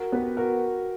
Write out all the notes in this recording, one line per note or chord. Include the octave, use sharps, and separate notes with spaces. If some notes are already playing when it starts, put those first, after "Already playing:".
Already playing: F#4 A#4
B3 G4 B4
F#4 A#4